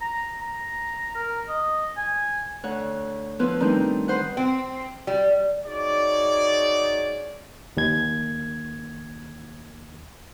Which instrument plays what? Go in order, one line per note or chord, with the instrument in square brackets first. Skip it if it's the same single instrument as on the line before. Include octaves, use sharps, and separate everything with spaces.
[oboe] A#5
A#5
A#4
D#5
G#5
[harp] D2 C#5 F#5
F3 B3 E4 F4 B4
D#3 G3 A3 C4 D4 D#4
B4 C5 F#5
[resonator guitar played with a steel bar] C4
G3
[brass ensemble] D#4 F#4 G#4 C#5 D5
[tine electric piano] D#2 G#6